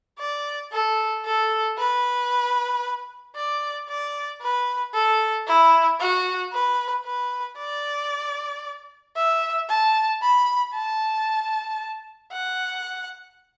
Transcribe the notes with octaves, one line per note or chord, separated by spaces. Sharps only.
D5
A4
A4
B4
D5
D5
B4
A4
E4
F#4
B4
B4
D5
E5
A5
B5
A5
F#5